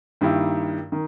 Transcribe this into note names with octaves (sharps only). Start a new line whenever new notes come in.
G2 D#3 A#3 E4 G4
D#3